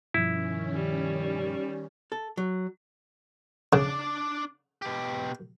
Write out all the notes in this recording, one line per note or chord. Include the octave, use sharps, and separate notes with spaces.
G2 B2 D#3 F3 C#4 E4
G3
A4
F#3
C#3 D4 D5
B2 G4